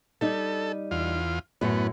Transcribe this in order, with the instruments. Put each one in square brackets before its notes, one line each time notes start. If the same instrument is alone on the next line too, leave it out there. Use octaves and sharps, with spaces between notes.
[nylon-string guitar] G3 D#4 [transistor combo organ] A4
[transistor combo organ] E2 F4
[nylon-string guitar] F#2 A2 [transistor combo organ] B3